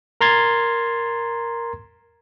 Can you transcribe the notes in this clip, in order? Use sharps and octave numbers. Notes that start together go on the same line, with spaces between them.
A#4 A#5 C6 G#6 A6